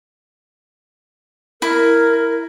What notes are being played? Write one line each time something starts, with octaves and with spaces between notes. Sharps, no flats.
E4 A#4